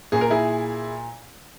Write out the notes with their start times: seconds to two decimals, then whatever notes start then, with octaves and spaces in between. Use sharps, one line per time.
0.12 A#2 G#4
0.21 A#4
0.30 E4 G#4